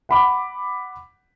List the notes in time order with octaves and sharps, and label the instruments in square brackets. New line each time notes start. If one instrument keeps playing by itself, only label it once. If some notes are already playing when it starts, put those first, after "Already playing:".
[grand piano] F#5 B5 D6